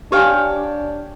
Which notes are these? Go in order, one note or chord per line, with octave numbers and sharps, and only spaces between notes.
D4 G4 C#5 F5 G5 G#5